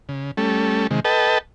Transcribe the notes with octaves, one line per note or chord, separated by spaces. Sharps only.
C#3
G3 A3 C#4 A4
C3 D#3 G#3
A4 B4 D#5 G5 A5